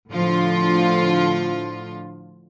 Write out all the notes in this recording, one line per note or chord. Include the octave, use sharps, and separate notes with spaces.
A2 D3 F3 F4